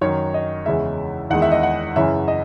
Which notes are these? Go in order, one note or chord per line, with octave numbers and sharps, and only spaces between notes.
F#2 D#3 F#3 C#5
D#5
E2 C#3 E3 G#3 E5
E2 D#3 G#3 F#5
E5
D#5
F#5
F#2 C#3 E3 E5
D#5